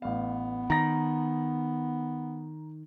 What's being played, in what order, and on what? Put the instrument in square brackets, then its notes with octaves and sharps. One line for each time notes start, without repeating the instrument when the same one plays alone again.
[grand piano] A1 F5 [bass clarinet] B3
[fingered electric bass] D#3 [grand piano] A#5 A#6